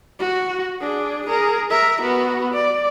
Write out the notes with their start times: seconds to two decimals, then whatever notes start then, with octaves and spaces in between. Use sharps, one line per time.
0.19 F#4
0.80 D4 G#4
1.26 G#4 A#4
1.70 A#4 E5
2.01 B3 F#4
2.53 D5